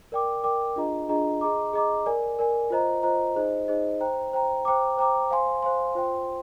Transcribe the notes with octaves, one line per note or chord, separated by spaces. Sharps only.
A#4 D5 G5 D6
A#4 D5 G5 D6
D4 F4 G#4 D#5 A#5
D4 F4 G#4 D#5 A#5
G#4 D#5 A#5 D6
G#4 D#5 A#5 D6
A#4 D5 G#5
A#4 D5 G#5
F4 C5 D#5 A#5
F4 C5 D#5 A#5
D#4 G#4 C5 D#5
D#4 G#4 C5 D#5
C5 G5 A#5
C5 G5 A#5
C5 G5 A#5 D6
C5 G5 A#5 D6
C5 F5 G#5 C6
C5 F5 G#5 C6
F4 C5 G5 C6